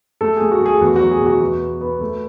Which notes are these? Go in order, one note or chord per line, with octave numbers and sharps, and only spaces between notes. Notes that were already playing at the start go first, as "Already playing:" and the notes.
A3 A4
A3 G#4
F#4
A3 G#4
E2 F#4
F#4
F#3
G#4
B2
F#4
E2 F#4
B3
B3
A3